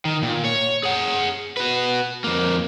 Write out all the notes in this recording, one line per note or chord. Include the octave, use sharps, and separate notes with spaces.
D#3
A#2
C#5
G#4 F#5
F#4 B4
F2 A#3